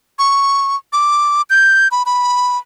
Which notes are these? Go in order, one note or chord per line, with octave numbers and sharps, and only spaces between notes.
C#6
D6
G6
B5
B5